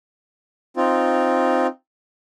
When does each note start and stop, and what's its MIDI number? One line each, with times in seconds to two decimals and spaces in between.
0.77 1.67 60
0.77 1.67 63
0.77 1.67 65